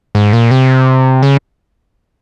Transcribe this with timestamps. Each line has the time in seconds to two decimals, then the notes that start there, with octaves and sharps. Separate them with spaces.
0.15 G#2
0.33 A#2
0.51 C3
1.23 C#3